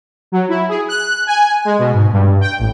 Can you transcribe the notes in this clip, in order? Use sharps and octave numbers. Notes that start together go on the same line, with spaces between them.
F#3
E4
G#4
F#6
G#5
G#3
B2
G#2
G2
G5
A1